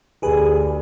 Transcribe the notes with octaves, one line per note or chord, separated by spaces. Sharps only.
D2 G4 G#4 B4